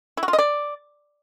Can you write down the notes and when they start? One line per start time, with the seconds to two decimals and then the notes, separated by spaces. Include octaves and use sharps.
0.17 E4
0.23 F#4
0.28 F4
0.33 D#5
0.39 D5